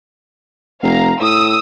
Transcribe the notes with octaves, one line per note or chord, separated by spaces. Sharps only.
F1 F5 A#5
A2 D#6 E6